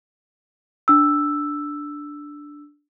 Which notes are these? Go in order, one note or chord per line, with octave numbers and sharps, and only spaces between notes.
D4 E6